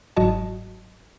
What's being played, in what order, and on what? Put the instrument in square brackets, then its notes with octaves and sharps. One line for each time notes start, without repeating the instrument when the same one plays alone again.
[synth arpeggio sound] G1 G#2 F#3 F#4 D#5 A5